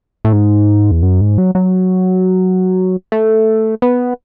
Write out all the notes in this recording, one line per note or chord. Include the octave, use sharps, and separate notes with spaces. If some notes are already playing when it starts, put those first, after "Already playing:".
A2
G#2
E2
F#2
G#2
F#3
F#3
A3
B3